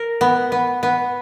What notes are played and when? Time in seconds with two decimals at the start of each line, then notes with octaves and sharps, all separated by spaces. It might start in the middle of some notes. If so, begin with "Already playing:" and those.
Already playing: A#4
0.21 B3
0.52 B3
0.83 B3